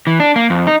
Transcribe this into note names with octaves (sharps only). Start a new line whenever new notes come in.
E3
D4
A#3
F2
D#4